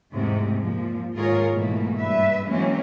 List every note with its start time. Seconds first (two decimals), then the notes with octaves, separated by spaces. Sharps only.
0.12 E2 G#2 C3 A3
0.61 A#2 F3
1.15 D#2 G#2 F4 G#4 A#4 C#5
1.52 G#2 B2 E3 A3 A#3
1.99 G2 B4 E5
2.47 E3 F#3 G#3 A#3 C4 C#4